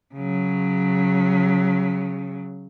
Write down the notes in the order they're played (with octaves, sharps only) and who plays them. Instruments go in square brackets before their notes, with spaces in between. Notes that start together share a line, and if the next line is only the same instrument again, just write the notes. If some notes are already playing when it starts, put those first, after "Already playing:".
[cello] C#3 F#3